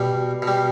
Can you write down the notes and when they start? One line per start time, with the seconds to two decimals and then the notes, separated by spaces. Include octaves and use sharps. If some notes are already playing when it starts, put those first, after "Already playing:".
Already playing: B2 G3
0.42 B2
0.47 G3